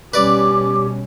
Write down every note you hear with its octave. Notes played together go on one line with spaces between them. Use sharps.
B2 G3 C#4 G4 B4 D5 D6